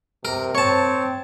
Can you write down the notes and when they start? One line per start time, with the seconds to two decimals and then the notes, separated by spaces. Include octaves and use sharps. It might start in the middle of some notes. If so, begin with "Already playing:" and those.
0.25 C3 A#4
0.55 C4 C#5 A5